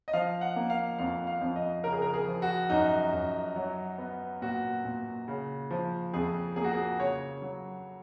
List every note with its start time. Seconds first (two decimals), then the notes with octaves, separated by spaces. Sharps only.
0.08 D#5
0.13 F3 F5
0.41 F#5
0.56 A#3
0.70 F5
0.98 F2 F5
1.27 F5
1.42 F2
1.56 D#5
1.84 C#3 A#4
1.93 G#4
2.02 A#4
2.14 G#4
2.27 F3
2.42 F#4
2.70 F#2 D#4
3.13 F#2
3.56 F#3
3.98 B3
4.42 A#2 F#4
4.85 A#2
5.28 C#3
5.71 F3
6.14 F2 G#4
6.56 A#3 G#4
6.64 F#4
6.71 G#4
6.99 C#3 C#5
7.42 F#3